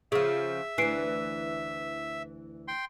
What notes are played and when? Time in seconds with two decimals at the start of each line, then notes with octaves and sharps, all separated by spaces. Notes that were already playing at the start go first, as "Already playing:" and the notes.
0.12 C#3 F3 G#4 E5
0.78 D2 E3 G#5 C7 D7
2.68 G5 C6